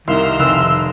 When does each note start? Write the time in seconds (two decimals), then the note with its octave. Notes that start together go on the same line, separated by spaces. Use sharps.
0.08 C2 D#3 E5 F5 C6
0.39 F1 E6 F#6